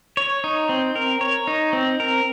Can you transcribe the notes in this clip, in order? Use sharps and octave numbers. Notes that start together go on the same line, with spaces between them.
C#5
D#4
C4
A#4
C#5
D#4
C4
A#4